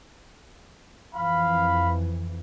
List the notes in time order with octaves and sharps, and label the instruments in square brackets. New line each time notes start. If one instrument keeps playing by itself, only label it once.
[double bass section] F2 E3 [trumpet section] F5 B5